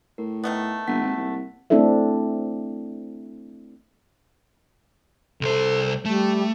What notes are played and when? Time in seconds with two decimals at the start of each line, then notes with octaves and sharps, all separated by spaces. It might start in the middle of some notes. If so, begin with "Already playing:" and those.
0.18 A2 A#4
0.43 D#3 A3 B3
0.88 G1 A#3 F#5 B6
1.01 G#1
1.16 C2
1.70 A3 C4 D4 E4 A4 E5
5.41 C2 A4 C5
6.05 G3 A3